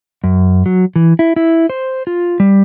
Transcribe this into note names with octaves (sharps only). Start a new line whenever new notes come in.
F#2
F#3
E3
E4
E4
C5
F4
G3